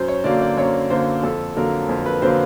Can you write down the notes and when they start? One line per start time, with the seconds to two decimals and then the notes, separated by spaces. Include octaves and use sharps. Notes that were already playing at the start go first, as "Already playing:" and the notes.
Already playing: F#2 C5
0.08 C#5
0.24 D3 F#3 A#3 D5
0.41 D5
0.57 F#2 C#5
0.90 D3 F#3 A#3 C5
1.23 F2 A4
1.57 D3 F#3 A#3 A#4
1.89 F2
2.06 B4
2.22 D3 F#3 A#3 C5